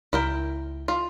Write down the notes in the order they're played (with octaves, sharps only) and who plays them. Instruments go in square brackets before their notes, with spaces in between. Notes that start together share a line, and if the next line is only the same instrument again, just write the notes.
[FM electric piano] C#2 [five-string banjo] E4 A#4 G5
[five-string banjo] F4